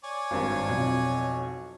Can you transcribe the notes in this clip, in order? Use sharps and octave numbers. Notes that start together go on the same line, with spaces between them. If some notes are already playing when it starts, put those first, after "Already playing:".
C#5 D5 G#5
G#1 G2
B1 F2